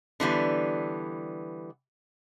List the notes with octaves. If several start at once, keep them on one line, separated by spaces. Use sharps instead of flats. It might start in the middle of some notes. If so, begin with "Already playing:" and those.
D3 E3 G3 B3